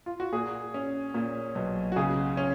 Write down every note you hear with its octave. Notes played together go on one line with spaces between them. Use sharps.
F4
F#4
A#2 G#4
C#4
A#2
B1
F#4
C#3 G#4
C#4